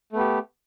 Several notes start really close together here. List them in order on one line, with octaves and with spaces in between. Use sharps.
A3 B3 G4